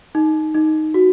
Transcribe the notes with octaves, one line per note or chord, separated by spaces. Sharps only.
D#4
D#4
F#4